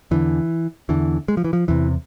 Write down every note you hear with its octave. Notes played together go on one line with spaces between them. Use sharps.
E2 D3 E3
E2 D3 E3
G#3
F3
E3
F3
E2 C3 E3